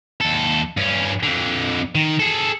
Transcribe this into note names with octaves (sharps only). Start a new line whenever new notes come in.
D#2 A4
G2 C#4
F2 D3
D#3
G#4 A4